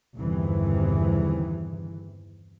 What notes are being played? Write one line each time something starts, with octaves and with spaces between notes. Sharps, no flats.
G1 E2 G2 C3 D#3 E3